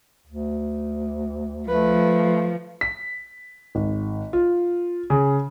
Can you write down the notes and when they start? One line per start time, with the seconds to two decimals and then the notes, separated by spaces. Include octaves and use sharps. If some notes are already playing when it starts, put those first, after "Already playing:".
0.27 D2
1.68 F3 A3 B4
2.81 B6
3.75 G#1
4.33 F4
5.10 C#3